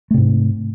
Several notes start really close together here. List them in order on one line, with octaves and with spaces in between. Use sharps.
A3 C3 G#2